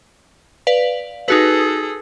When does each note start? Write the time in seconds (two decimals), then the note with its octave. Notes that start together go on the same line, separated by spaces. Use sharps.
0.67 B4 D5 F5
1.28 D#4 F#4 G#4 A4 B4